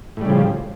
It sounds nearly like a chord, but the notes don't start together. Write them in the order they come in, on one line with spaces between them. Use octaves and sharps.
A2 G3 C#3 F3